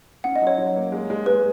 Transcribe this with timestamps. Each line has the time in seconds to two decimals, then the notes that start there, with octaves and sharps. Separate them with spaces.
0.24 C#4 F#5
0.36 D#5
0.42 F#3
0.47 C#5
0.58 F#3
0.76 A#3
0.92 G#3
1.10 G#3
1.26 G#3 B4